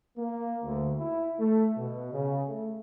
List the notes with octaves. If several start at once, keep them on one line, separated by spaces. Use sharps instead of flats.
A#3
D2
E4
A3
B2
C#3
A3